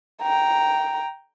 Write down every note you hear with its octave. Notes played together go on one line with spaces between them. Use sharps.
G5 A#5